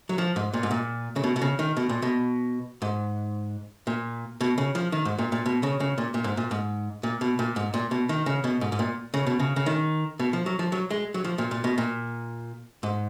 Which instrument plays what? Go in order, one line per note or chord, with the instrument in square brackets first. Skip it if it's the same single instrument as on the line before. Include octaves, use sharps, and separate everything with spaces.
[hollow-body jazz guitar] F#3
F3
G#2
A#2
G#2
A#2
C#3
B2
B2
C#3
D#3
B2
A#2
B2
G#2
A#2
B2
C#3
F3
D#3
G#2
A#2
A#2
B2
C#3
C#3
A#2
A#2
G#2
A#2
G#2
A#2
B2
A#2
G#2
A#2
B2
D#3
C#3
B2
G#2
G#2
A#2
C#3
B2
C#3
C#3
D#3
B2
F3
F#3
F3
F#3
G#3
F#3
F3
A#2
A#2
B2
A#2
G#2